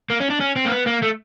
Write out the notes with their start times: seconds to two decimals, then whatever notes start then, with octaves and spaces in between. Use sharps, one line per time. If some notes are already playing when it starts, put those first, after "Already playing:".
0.10 A#3
0.20 C#4
0.30 D4
0.41 C#4
0.57 C4
0.66 A#3
0.72 B3
0.87 A#3
1.03 A3